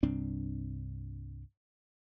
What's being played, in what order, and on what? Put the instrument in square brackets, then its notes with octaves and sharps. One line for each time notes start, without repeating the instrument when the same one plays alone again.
[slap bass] C2 G2 C4 D4